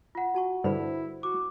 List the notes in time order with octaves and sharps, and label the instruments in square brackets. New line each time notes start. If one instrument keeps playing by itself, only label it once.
[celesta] F4 F#5
[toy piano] F#4 A5 C#6
[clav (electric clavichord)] G2 D3 [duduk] E4 [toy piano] C5 B5
[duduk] F#4 [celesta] D6